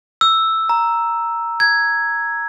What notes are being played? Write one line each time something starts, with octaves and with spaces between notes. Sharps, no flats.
E6
A#5
G#6